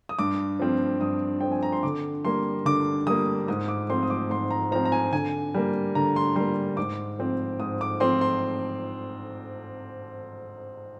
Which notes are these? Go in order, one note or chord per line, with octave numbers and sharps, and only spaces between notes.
D#6
G2 D6
F3 C4
G2 D#6
F3 C4 G5
G#5
A#5
C6
D3 D6
G3 A#3 C6
D3 D6
G3 A#3 D#6
G#2 D#6
D6
F3 C4 C6
D#6
D6
G#2 C6
A#5
F3 C4 A#5
A#5
G#5
D3 G#5
G3 A#3
D3 A#5
C6
G3 A#3 C6
G#2 D6
F3 C4
G#2 D#6
D6
F3 C4 C6
C6